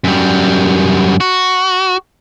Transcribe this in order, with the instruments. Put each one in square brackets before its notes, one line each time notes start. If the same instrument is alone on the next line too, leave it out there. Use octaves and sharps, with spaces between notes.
[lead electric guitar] F#2 G3
F#4